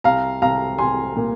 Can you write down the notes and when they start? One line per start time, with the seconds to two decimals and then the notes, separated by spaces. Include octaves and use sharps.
0.04 C2 F5 A#5
0.42 C2 F5 A#5
0.78 C2 G#5 C6
1.16 A#2